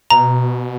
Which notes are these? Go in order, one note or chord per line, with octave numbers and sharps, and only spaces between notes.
B2 A#5